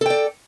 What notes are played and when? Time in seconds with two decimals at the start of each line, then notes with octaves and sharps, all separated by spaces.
0.01 A4
0.06 G5
0.10 D5